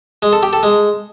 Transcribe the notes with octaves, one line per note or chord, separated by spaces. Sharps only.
G#3
A4
G4
A4
G#3